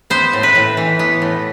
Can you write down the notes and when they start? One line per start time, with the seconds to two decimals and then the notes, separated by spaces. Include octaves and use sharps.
0.10 B3 C5
0.33 A2
0.43 B4
0.55 A2
0.77 E3
0.99 B3
1.22 A2